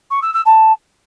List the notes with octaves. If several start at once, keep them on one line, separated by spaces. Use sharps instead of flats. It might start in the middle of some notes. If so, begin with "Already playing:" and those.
C#6
E6
E6
A5